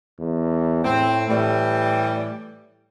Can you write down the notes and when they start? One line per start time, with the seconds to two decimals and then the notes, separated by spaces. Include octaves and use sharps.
0.19 E2
0.85 A2 C4
1.29 A2 E3 G3